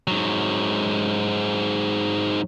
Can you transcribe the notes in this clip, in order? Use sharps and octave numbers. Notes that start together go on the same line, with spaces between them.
G#2 F#3